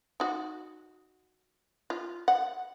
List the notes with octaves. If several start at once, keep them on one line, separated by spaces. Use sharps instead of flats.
D#4 F#4
F4
F#5